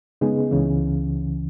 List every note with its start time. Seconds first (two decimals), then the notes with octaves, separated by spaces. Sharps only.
0.21 C#3 G#3 B3 D#4 G#4
0.51 C#2 C#3 E3